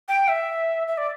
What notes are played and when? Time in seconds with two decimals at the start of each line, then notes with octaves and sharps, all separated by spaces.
0.08 G5
0.28 E5
0.88 E5
0.98 D5